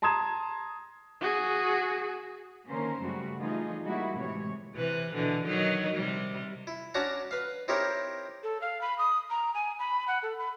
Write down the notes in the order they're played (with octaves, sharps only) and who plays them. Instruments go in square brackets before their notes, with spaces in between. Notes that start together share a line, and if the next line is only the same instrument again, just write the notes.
[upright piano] A5 A#5 C6 D#6 G#6 E7
[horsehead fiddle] F#4 G#4
[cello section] D3 D#3 A#3 C#4 A#4 C5
F#2 C#3 G3 A3 F#4
E3 G3 A3 D#4 F4 G#4
G3 A#3 D#4 E4 F#4
A2 C3 E3 G#3 C#5
[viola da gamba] C3 E3 B4
B2 D3 E3
D#3 F#3 D#4
C3 G3
[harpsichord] E4
C#4 D4 F#4 F#5 A5 A#5
B4 F5
C4 D#4 E4 G4 A#4 C#5
[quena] A4
F5
B5
D#6
A#5
G#5
B5
F#5
A4
B5